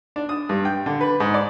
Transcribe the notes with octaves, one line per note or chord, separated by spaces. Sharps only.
D4
D#6
G2
G5
D3
B4
G#2
D5